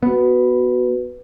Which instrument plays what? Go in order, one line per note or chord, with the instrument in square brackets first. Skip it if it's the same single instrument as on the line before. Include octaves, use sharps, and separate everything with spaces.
[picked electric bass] B3 [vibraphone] F#4 B4